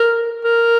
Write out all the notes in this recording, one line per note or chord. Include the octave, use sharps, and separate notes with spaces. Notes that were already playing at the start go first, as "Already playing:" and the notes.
Already playing: A#4
A#4